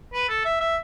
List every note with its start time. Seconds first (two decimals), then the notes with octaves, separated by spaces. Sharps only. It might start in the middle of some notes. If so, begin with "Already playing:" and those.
0.14 B4
0.29 A4
0.45 E5
0.60 E5